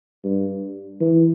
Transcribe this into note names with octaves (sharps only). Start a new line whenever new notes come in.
G2
E3